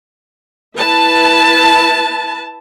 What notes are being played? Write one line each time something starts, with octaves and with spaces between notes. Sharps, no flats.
E4 B4 A5